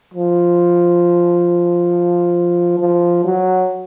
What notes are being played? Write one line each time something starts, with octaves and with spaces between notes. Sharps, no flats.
F3
F3
F#3